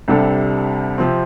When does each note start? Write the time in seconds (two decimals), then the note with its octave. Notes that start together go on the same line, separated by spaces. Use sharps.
0.08 C2 C3 G3 D4 A4
0.98 C3 F3 C4